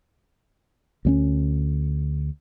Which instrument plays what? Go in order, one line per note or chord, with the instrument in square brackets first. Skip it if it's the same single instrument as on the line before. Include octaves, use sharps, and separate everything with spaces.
[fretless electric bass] D2 G3 C#4